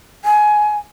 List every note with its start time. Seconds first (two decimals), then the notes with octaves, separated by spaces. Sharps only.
0.24 G#5